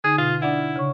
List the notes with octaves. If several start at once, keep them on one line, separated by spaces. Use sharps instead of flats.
D3 D#4 G#4
B2 F4
D4 E4 D5 F#5
C#3 C#5 C#6